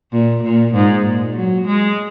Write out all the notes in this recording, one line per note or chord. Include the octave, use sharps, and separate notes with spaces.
A#2
A#2
G#2
A#2
F#3
G#3